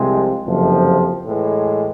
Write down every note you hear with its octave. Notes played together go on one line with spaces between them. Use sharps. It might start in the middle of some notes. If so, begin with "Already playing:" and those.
Already playing: C2 C3 F3 G#3 C4
F#1 F2 C3 F3
A2 E3 G#3